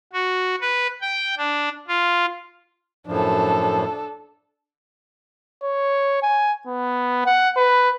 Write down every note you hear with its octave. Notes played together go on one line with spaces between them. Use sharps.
F#4
B4
G5
D4
F4
F#2 A2 F3 D4 A4
C#5
G#5
B3
F#5
B4